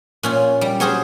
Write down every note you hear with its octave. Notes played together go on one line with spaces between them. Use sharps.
A#2 C#4 F4
G3
F#3 C#4 G#4 C5